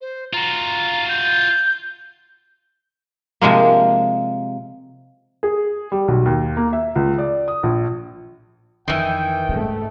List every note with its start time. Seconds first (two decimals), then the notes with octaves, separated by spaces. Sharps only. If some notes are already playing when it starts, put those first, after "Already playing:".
0.01 C5
0.33 F4 F#4 A#5
1.08 G6
3.41 C3 F3 G#3 A#3
5.43 G#4
5.92 G3
6.08 B1
6.26 D#2
6.57 A#3
6.73 E5
6.95 C#2
7.18 D5
7.48 D#6
7.63 A#1
8.88 F2 D#3 E3 G5
9.49 G#2 C#3 A3